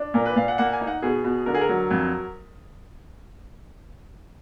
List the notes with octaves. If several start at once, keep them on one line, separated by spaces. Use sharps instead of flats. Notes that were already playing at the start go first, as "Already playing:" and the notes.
Already playing: D4
A#2 A#4
B4
A#2 F5
F#5
A#3 F#5
G#5
D#4
F#5
B2 G#4
B2
D3 A#4
G#4
A#4
F#3
F2